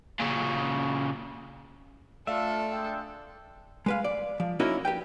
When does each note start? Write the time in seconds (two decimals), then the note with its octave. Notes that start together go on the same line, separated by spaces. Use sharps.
0.19 A#2 C#3
2.27 A3 D4 F4 A4 D5 E5 F5
2.70 G#3 D4 G5
3.86 G#3 B4 F5
4.04 D5
4.40 F3
4.60 A#3 C#4 D#4 E4 F#4 A#4
4.85 G4 B4 G5